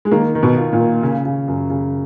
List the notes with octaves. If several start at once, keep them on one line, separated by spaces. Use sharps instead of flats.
G#3
D#3 A#3
D#3
B2
F4
A#2
A#3
C#3
C#3
F#2
C#3